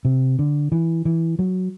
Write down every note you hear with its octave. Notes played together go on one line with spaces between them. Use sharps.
C3
D3
E3
E3
F#3